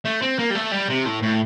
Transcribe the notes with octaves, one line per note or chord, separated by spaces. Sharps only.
A3
C4
A#3
G3
A3
G3
C3
A2
A2